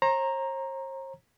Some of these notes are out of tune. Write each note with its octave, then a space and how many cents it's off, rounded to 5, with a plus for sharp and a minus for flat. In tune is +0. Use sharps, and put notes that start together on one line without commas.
C5 +45 A#5 +0